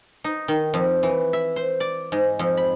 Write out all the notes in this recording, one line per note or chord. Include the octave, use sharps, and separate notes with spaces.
D#4
D#3
F2
E3
E5
C5
D5
G#2
F2
B5